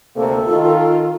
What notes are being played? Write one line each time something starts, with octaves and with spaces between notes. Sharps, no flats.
D2 C3 A#3 A4
D#3 F4